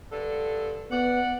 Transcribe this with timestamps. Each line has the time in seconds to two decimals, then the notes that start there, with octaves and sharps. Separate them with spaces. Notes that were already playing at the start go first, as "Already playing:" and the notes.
0.12 G2 D3 A4
0.91 B3 D5 F#5